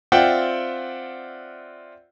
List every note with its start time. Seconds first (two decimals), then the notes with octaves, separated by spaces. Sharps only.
0.12 C4 F4 D5 E5 F#5 G5